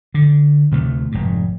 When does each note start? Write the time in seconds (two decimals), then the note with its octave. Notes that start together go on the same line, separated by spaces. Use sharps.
0.14 D3
0.72 D2 C3 G3 A3
1.12 F1 G#2